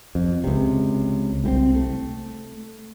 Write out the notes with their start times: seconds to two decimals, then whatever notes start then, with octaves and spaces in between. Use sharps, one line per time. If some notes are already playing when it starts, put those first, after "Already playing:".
0.15 F2
0.44 C#2 C3
1.44 C2 G3 C4
1.75 A3